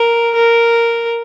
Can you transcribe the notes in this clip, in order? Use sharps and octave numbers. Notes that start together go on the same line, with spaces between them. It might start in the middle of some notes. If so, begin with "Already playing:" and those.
Already playing: A#4
A#4